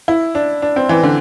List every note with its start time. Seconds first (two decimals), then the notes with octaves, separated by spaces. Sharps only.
0.08 E4
0.35 D4
0.62 D4
0.76 C4
0.89 E3
1.03 D3